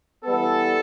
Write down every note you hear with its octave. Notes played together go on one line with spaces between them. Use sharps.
E3 G3 B3 A4